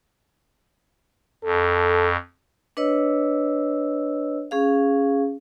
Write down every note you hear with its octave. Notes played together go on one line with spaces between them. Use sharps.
F2 A4
D4 B4 C#5 D#5 E6
C#4 G#4 F5